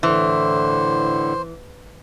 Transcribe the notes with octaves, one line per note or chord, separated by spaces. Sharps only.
A2 D3 E3 C5